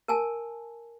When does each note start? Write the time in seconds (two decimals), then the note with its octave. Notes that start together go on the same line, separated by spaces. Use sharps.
0.08 A#4 G#5 A5